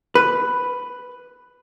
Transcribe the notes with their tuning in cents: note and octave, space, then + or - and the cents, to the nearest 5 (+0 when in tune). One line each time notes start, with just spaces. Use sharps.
B4 +5